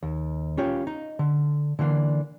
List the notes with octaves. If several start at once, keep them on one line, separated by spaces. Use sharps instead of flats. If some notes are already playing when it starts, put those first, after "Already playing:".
D#2
C#4 F4 G4 C#5
D#4
D3
D3 E3 A#3 D4